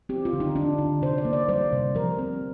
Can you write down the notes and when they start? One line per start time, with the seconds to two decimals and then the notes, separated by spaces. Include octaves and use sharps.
0.09 C4 G4
0.25 F4
0.33 D3
0.40 D#4
0.55 D3 D4
0.78 D3 D#4
1.02 C3 C5
1.18 D5
1.25 A#3
1.33 D5
1.49 G3 C5
1.72 C3
1.95 F3 A#4
2.19 C4